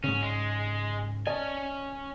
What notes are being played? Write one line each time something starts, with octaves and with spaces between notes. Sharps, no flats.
G#2 C#3 C#4
G#3
C#4 D5 D#5 G#5 A5